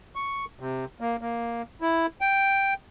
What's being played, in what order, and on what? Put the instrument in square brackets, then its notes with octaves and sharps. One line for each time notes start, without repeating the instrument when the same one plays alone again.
[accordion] C#6
C3
A#3
A#3
E4
G5